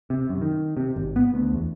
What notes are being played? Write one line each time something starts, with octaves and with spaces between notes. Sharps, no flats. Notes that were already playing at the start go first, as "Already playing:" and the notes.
C3
F#2
D#3
C3
G#1
B3
D2
E2